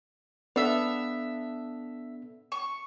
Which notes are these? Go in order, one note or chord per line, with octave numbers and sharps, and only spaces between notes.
B3 D4 A4 E5 F5
C#6